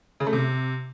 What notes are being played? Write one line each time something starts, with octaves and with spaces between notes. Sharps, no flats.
C#3
A3
C3